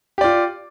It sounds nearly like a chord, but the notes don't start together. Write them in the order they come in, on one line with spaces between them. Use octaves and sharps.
G4 D5 F4